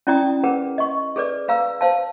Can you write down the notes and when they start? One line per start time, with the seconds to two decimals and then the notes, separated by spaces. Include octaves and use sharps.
0.07 C#4 E4 D5 G5 A#5 D#6
0.44 G#4 A#4 B4 F#5
0.78 D#5 C#6
1.16 G#4 A4 B4 D5
1.48 B4 F5 A#5 E6
1.81 C5 F5 A5